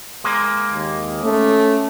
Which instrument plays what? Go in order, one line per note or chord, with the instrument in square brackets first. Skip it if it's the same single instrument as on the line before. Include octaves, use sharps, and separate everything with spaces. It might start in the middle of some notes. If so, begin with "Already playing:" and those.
[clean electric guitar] G#3 A#3
[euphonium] D#2
[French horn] A3 [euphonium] C#4